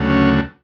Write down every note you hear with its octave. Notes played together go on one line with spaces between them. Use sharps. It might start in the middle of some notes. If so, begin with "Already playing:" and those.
Already playing: D2 C#3 F#3 A3
C#4